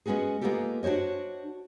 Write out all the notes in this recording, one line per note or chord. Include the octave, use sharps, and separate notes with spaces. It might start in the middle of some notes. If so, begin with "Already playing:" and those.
G#3 B3 C#4 F#4 G#4
G#3 A#3 B3 F4 G4 A4
D4 F#4 C5 C#5 D#5